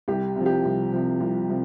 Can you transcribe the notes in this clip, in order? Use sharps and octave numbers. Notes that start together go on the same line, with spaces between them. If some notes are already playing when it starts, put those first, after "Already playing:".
C2 G4
C3 F3
G4
C2
C3 F3
C2
C3 F3